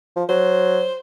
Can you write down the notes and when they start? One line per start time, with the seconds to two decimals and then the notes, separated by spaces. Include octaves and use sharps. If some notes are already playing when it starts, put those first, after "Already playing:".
0.16 F3
0.29 F#3 C5